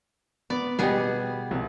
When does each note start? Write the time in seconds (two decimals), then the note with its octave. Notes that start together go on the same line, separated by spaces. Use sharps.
0.50 B3 D5
0.79 B2 G3 B3 G4 G#4
1.51 C2